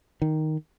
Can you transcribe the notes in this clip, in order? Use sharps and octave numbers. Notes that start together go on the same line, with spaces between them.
D#3